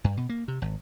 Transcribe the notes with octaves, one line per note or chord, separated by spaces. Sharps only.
G2
B2
A#3
C3
G#1